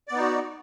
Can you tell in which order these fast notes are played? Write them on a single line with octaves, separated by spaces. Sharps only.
D5 B3 D#4 F#4